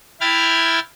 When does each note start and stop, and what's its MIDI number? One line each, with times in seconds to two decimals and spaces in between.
0.21 0.80 64
0.21 0.80 79
0.21 0.80 83
0.21 0.80 89
0.21 0.80 92
0.21 0.80 93